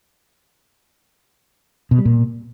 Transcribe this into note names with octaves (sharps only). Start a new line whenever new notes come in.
B2
G3
A#2